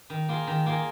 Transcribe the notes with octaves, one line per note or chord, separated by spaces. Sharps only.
D#3
A#3 F4 G#4
D#3
A#3 F4 G#4